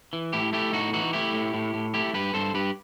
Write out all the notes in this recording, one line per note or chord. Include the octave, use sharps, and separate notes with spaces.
E3
A2 E4 G4
A3 E4 G4
A2 D#4 F#4
E3 D#4 F#4
A3 E4 G4
A2
A2
A2
A3 E4 G4
G2 G4 B4
G2 A4 C5
G2 G4 B4